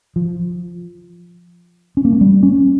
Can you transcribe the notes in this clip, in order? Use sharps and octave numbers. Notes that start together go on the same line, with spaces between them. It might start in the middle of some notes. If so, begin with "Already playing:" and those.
F3
C#4
A#3
A3
G3
C#4